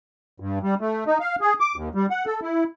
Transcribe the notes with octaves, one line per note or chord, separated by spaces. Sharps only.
G2
G3
A3
D#4
F5
G#4
D6
D#2
G3
F#5
A4
E4